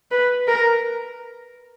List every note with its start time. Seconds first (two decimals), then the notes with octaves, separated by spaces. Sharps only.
0.12 B4
0.48 A#4